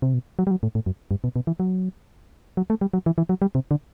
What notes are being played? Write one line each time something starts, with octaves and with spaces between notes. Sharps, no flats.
C3
B2
F#3
G3
F#3
A2
A2
F#2
G2
B2
B2
E3
F#3
F#3
A3
G3
F#3
E3
E3
F#3
G3
C3
D3